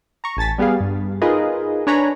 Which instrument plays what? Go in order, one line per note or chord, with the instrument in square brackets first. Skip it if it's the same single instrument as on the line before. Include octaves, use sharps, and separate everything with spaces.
[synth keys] A#5 C#6
A1 G#5 A5 A6 B6
G3 B3 G4 G#4 F5
G2
D#4 F4 G#4 A#4 B4 D#5
D4 B4 C#5 G#5 A#5 B5